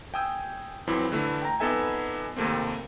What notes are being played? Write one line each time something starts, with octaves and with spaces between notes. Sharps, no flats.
G5 G#5 D#6 E6 G6
F2 E3 F#3 C4 E4
D3 E3 A3 E4
G5 A#5
F2 B3 D#4 A4 E5 G#5
D#2 C3 A3 A#3 C4